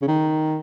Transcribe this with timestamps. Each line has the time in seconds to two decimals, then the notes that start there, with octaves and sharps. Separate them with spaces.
0.02 C#3
0.07 D#3